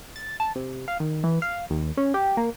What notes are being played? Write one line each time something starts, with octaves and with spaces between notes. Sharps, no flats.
A6
A5
C3
F5
D#3
E3
F5
D#2
C#4
G4
A#3